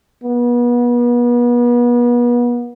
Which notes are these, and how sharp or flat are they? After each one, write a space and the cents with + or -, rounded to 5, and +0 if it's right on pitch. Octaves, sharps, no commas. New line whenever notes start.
B3 -35